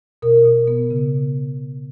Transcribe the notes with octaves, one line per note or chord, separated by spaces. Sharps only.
B2 A#4
B2
B3
C#3